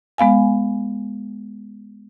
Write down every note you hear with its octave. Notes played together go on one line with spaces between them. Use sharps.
G#3 B3 F5 G#5